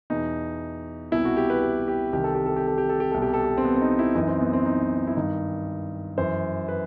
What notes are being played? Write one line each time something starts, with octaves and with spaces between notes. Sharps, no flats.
E2 B2 D#4
C2 B2 E4
F#4
G4
B4
G4
G4
C2 C3 D#3 G4
A4
G4
A4
G4
A4
G4
A4
G4
C2 B2 A4
G4
A4
G4
C4
B3
C4
D#4
E4
F#2 E3 D#4
C4
B3
C4
D#4
E4
G2 D#3 D#4
F#2 E3 C5
B4